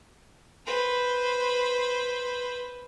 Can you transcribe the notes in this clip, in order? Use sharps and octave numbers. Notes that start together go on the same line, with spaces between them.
B4 C5